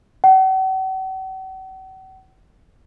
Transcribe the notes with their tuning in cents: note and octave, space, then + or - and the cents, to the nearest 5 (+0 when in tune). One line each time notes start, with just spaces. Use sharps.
F#5 +45